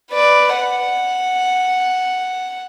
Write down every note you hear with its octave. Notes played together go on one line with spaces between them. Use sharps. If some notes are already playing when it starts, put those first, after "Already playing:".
B4 D5
F#5